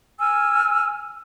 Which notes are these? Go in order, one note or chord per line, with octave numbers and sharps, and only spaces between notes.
G#5 E6 F6